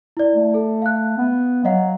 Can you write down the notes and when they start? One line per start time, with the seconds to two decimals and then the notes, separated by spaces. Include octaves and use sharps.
0.17 E4 D5
0.35 A3
0.54 A4
0.82 F5 F#6
1.18 B3
1.65 F#3 D#5 F5 F#5